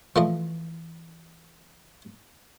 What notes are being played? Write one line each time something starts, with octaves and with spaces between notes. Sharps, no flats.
E3 F3 A3 D#5